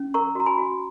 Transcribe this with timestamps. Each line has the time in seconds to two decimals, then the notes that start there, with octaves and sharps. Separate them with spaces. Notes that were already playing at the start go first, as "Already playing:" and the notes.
Already playing: C#4
0.14 A#4 A#5 C#6
0.35 F#4 A#5
0.46 G#5 B5
0.58 F#4